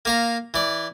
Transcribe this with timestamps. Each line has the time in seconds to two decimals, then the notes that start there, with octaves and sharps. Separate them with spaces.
0.05 A#3 F5 A#5
0.54 E3 D5